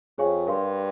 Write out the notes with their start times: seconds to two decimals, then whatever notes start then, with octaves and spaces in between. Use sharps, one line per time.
0.18 F2 G#4 C#5 F5 G#5 C#6
0.47 G2 A#4 F5 C6